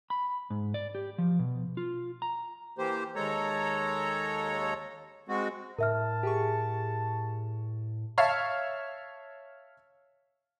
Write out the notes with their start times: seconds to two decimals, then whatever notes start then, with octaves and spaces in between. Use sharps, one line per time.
0.10 B5
0.50 G#2
0.74 D5
0.95 G4
1.18 F3
1.39 B2
1.77 F4
2.22 A#5
2.78 E3 A#3 G4 C5
3.15 D#2 G#3 A4 C#5 A#5
5.28 G#3 C4 F#4
5.78 A2 A#4 E5 A5 F6
6.23 G4 G#4 C#6
8.18 C#5 E5 F5 A5